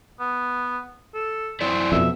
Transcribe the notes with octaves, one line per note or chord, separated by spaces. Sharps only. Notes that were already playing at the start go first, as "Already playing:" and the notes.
B3
A4
F#2 C4 E4 D5
F2 B2 E5